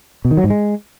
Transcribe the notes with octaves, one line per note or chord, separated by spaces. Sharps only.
B2
D#3
F#3
G#2
G#3